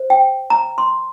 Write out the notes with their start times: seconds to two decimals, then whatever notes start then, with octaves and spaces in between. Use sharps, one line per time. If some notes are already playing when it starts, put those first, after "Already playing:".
Already playing: C5
0.10 G5
0.50 A#5
0.78 C6